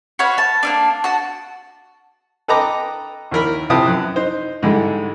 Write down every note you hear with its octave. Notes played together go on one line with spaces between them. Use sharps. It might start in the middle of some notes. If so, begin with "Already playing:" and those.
F#4 B4 C#5 F5
A5
A#3 C#4 D4
F#4 A5
A4 B4 D#5 G5 A#5 D6
D#2 E3 A#4 B5
C3 F3 E4 B4 A5 D#6
F#2 F#6
D#4 C5
G#2 D3 E3 G3 G#3